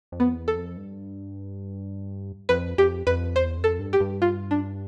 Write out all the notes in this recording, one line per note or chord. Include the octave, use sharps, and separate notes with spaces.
F2
B3
E2
A4
F2
G2
F2 B4
F2 G4
F2 B4
E2 C5
F2
A4
G2
G4
G2
F4
D4